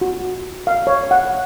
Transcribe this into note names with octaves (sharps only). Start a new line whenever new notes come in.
F#4
F5
C#5
F#5